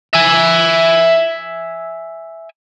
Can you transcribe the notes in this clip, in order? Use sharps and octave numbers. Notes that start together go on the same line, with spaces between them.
E5 G#5